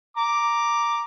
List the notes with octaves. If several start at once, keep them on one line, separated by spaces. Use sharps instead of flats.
A#5 D6